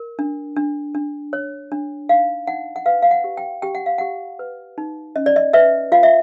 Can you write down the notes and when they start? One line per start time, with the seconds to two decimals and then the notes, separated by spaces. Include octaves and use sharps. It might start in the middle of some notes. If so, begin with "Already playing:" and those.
Already playing: A#4
0.19 D4
0.56 D4
0.95 D4
1.33 C#5
1.72 D4
2.09 D#4 F5
2.47 D#4 F#5
2.76 F#5
2.86 B4 F5
3.03 F5
3.11 F#5
3.24 G4
3.37 G5
3.62 G4 G5
3.75 F#5
3.86 F5
3.98 G4 F#5
4.39 B4
4.78 D#4
5.16 C#4 D#5
5.26 D5
5.36 D#5
5.53 B4 E5
5.92 F4 F5
6.03 E5